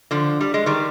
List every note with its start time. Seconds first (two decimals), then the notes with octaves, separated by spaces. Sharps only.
0.11 D3 F3
0.41 G3
0.54 G#3
0.66 D#3 G3